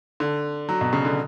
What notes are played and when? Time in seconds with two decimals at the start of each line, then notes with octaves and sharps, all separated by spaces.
0.20 D3
0.69 F#3
0.81 B2
0.93 C#3
1.05 D3